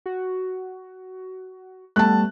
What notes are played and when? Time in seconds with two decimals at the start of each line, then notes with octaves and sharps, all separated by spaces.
0.06 F#4
1.96 G3 A3 B3 A5 F#6